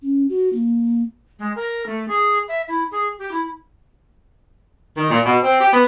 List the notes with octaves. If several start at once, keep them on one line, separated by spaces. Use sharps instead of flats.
C#4
F#4
A#3
G#3
A#4
A3
G#4
E5
E4
G#4
G4
E4
D#3
A#2
B2
C4
G4
B3